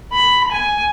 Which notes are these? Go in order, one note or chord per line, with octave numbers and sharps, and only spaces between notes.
B5
G#5